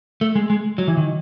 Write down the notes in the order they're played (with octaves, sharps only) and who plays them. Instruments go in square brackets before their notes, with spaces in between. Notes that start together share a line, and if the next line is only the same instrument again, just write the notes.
[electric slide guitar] A3
G#3
G#3
F#3
E3
D#3